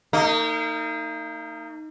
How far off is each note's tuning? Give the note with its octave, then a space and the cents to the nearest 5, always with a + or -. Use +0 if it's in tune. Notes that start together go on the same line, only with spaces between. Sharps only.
A#3 -40 D#4 +0